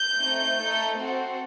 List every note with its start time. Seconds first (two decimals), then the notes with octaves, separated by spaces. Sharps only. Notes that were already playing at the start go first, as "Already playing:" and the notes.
Already playing: G6
0.20 A3 C4 D#4
0.60 A3 D#4 A4
0.99 C4 F#4 A4